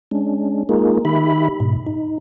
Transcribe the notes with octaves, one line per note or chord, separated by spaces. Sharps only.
G#3 C#4 D4
G#3 A#3 D#4 F4 G#4 A#4
D#3 D#4 G4 E5 B5
G#2 B2
D#4